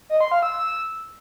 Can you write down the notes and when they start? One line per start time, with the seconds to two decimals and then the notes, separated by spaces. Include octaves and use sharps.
0.10 D#5
0.21 C6
0.32 F5
0.43 E6
0.54 E6